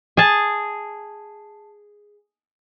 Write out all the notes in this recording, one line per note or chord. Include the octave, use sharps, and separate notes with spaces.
G#4 A5